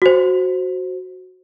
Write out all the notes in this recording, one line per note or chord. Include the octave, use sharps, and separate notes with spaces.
F#4 C5